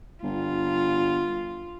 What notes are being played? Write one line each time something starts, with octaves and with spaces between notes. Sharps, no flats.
G1 F4